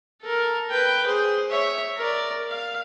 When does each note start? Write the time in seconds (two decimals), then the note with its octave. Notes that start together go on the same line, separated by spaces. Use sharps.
0.22 A4 A#4
0.70 B4 G5
1.05 G#4 C5
1.49 C#5 E5
1.96 A#4 D5
2.49 F5